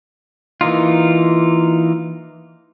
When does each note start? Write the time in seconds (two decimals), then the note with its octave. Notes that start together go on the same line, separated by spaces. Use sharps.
0.61 E3 A#3 D#4 F4